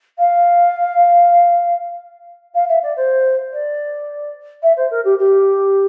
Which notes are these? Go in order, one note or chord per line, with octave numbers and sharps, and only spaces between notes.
F5
F5
E5
D5
C5
D5
E5
C5
A#4
G4
G4